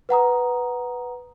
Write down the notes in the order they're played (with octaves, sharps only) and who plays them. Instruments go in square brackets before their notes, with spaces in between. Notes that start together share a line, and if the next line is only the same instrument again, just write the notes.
[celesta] B4 F#5 A#5 D#6